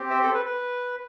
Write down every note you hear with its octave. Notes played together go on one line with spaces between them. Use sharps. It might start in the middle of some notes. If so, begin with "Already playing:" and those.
Already playing: C4 G4
C5 E5
A4 C5
B4
B4